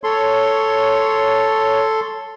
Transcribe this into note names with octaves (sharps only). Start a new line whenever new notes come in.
A4 C#5 C6